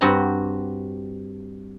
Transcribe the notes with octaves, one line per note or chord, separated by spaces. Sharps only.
G2 C4 F#4 G4 A#5